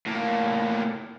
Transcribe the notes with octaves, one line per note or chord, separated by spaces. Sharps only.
A2 A#3